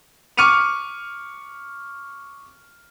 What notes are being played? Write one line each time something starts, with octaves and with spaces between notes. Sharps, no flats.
C#6 D6 F6 C#7 D#7 F7